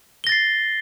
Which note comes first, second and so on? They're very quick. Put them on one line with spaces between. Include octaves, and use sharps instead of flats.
G7 A#6 A6 C7